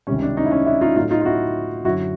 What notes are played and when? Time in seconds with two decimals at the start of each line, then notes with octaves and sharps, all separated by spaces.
0.07 C#2 C3 D#3 G3 C#4
0.22 D4
0.37 C#4 D#4
0.46 E4
0.51 C#4 D#4
0.66 D4 E4
0.81 D#4 F4
0.96 A2 F#3 A3 D#4 F4
1.10 D#4 F4
1.21 F4
1.25 E4 F#4
1.85 F#2 D3 F#3 E4 F#4